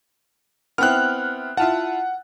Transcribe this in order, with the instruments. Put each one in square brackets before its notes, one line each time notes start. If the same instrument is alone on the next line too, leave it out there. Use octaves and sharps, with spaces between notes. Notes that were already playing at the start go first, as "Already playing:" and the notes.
[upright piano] B3 C4 E4 [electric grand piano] F6 F#6
[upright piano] E4 F4 A5 [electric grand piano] F#5